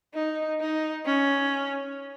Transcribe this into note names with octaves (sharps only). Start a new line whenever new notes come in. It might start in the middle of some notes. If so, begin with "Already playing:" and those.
D#4
D#4
C#4